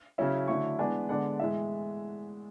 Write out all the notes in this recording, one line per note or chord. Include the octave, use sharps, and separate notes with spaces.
C#3 F#3 C#4 E4 E5
D3 F#3 A3 E4 C#6
E3 G#3 B3 D4 G#5
D3 G#3 B3 D4 F#5
A2 E3 G#3 E5